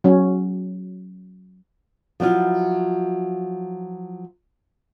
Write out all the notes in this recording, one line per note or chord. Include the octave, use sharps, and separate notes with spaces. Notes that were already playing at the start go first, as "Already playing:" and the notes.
F#3 C#4
F3 F#3 E4 F4